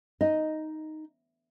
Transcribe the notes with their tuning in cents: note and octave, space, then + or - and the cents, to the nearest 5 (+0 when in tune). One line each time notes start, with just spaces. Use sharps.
D#4 +0 D#5 +0